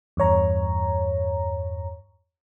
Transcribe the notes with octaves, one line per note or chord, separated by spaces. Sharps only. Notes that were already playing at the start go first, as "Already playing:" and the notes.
E2 G2 C#5 A#5